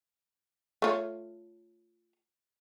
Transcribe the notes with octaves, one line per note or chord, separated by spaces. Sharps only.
A3 F4 C#5